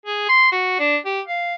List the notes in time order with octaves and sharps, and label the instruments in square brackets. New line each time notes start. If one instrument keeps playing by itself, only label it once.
[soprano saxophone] G#4
C6
F#4
D4
G4
F5